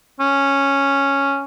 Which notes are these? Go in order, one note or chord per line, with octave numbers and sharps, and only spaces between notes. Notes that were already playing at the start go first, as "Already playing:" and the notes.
C#4